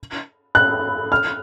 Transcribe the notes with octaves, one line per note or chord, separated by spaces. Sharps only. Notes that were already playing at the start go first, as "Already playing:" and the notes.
F#6
F6